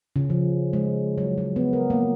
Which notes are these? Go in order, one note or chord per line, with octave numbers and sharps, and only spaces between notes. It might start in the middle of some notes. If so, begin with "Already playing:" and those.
C#3
F3
G#3
F#3
F#3
B3
A#4
A#3